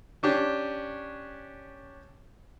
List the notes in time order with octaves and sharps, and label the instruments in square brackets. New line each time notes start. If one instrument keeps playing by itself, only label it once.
[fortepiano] C#4 D4 G4